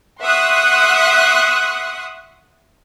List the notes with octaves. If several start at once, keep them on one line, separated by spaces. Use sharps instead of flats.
E5 F#5 C6 C#6 D#6 F#6